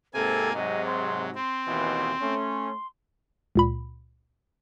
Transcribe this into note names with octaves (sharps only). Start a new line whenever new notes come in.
G#2 C3 A#3 C4 A4 G#5
G#2 C3 F#3 D#5
C6
C4 C6
D#2 B2 E3
A3 C#4
C#2 A#2 B5